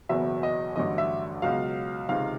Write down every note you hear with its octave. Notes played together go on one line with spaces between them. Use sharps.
F#1 E2 B2 F#3 E5
D#5
A1 G2 D3 F#3 D#5
E5
C#2 B2 F#3 F5
C#2 C3 D#3 F5